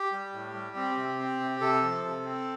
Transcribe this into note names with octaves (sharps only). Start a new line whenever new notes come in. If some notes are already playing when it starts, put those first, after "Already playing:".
Already playing: G4
G3
A2
G3
C4
C3
C4
C3
C3 A4
F3
C3
C4